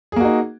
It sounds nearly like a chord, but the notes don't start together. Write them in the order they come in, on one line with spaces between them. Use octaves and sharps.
G#4 A#3 F#4 D#4